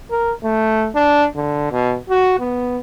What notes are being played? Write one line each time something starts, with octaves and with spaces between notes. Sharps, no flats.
A#4
A3
D4
D3
B2
F#4
B3